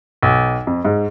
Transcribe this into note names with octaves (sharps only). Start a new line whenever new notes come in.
B1
F2
G#2